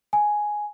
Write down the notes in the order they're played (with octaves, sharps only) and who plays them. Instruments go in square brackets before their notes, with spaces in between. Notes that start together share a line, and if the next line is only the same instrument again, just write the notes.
[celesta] G#5